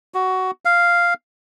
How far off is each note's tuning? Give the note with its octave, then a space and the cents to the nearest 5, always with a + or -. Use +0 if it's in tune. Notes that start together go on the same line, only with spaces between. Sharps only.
F#4 +15
F5 -5